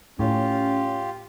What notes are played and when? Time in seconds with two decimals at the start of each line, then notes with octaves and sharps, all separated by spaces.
0.19 A2 C#4 F4 G4